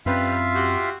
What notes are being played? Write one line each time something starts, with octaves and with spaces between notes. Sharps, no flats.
F#2 G3 C4 F4 B4 E5 F5
F#4 G4